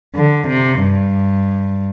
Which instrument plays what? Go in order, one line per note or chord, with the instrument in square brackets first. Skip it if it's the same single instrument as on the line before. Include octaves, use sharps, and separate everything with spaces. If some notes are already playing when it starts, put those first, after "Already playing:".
[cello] D3
C3
G2